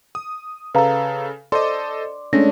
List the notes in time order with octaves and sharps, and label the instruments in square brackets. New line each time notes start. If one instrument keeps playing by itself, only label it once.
[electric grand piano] D#6
[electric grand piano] C#3 A4 [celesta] B4 F5 A#5
[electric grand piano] A4 C5 D#5 [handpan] D5 [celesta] C6
[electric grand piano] G#3 A3 [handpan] C#4 D4 [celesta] A#6